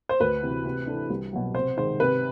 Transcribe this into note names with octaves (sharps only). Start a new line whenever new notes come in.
C5
D2 B4
C3 E3
C3
E3 A3 D4
C2
B2 F#3
C3 C5
D#3 G#3 C5
C3 B4